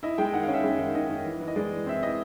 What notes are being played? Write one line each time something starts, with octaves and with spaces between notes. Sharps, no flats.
E4 D#5
G#3 G5
D#3 F#5
F5
C#4
E5
G#3
D#3
D#3 D#5
D#3
E3
E3
D#5
G#3 D5
E3
C4 E5
E3 D#5